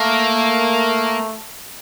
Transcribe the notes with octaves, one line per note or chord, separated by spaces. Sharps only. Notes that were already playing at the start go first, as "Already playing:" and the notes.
Already playing: A3 A#3